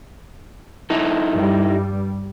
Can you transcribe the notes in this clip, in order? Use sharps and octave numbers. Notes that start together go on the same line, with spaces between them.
D#4 E4 A4
G2 G3